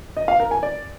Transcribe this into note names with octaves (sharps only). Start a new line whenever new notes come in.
D#5
F5
A#4
G#5
D5